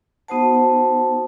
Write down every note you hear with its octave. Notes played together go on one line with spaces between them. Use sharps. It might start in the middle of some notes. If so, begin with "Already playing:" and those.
B3 D#4 F#4 C5 F#5 A5